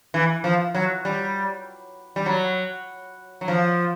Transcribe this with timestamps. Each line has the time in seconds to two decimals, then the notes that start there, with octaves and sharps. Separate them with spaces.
0.14 E3
0.44 F3
0.75 F#3
1.05 G3
2.16 G3
2.26 F#3
3.41 F#3
3.48 F3